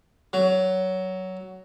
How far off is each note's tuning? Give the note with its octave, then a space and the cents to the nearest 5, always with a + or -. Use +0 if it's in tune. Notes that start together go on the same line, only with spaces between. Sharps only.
F#3 +10